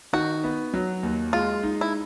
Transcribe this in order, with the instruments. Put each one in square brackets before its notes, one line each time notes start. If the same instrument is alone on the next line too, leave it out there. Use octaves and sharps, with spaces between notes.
[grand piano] D#3 [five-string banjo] F#4
[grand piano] B3
F#3
D#2
[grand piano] G#3 [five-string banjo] F4
[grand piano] D#4
[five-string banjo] E4